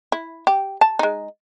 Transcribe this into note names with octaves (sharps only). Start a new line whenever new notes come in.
E4
G4
A5
G#3 D#4